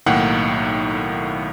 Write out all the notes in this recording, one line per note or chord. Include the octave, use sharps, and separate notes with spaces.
B1 A2 D#3 A#3 F#5 G5